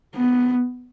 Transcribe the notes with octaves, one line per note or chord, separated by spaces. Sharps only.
B3